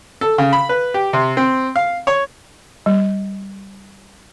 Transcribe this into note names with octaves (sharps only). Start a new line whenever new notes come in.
A4
C#3
B5
B4
G4
C3
C4
F5
C#5
G3